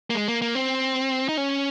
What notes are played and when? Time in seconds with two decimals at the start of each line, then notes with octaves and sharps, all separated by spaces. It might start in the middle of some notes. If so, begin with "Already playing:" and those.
0.10 A#3
0.14 G#3
0.28 A#3
0.42 A#3
0.55 C4
1.29 D#4
1.37 C#4